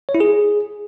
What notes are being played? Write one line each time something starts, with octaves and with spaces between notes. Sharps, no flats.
C#5
E4
G#4